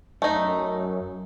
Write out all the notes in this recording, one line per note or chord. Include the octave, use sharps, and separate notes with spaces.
F#2 A3 D#4